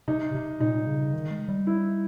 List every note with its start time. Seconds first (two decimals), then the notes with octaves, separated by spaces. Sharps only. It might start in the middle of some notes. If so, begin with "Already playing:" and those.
0.08 C3 D#4
0.35 C3
0.60 A#2 D#4
0.87 C#3
1.13 D#3
1.31 G#3
1.48 G3
1.67 E4